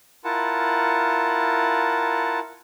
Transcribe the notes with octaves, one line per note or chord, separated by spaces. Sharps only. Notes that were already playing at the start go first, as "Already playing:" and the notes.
E4 F4 A#4 F#5 A5